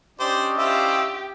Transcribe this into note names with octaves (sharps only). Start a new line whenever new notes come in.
C#4 D4 G4 C5 D5 D#5
E4 F4 G4 C5 E5